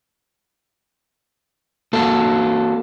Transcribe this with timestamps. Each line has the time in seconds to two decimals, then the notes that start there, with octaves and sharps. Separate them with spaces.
1.93 A#3 F#4 A4